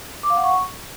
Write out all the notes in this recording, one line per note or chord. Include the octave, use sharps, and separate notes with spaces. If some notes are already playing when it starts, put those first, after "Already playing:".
D6
F5
F#5
C#6